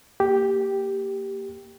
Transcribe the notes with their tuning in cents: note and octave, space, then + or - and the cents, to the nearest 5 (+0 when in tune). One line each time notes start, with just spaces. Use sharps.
A#3 -15 G4 +0